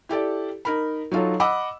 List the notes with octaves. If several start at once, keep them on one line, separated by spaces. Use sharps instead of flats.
E4 G4 A4 D5
D#4 A#4 B5
F#3 D#4 F4 A4 C#5
D#5 F#5 B5 D6 E6